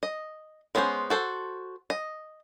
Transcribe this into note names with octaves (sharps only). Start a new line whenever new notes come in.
D#5
G#3 B3 C#4 G#4 C5
F#4 A4 C5
D#5